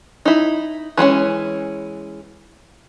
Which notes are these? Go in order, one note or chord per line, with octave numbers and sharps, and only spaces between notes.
D#4 E4
E3 G#3 B3 C#4